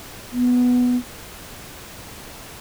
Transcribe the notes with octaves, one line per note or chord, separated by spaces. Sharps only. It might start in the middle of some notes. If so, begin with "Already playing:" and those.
B3